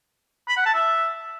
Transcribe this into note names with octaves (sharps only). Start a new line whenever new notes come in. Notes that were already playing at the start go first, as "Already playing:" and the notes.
B5
F#5
A5
E5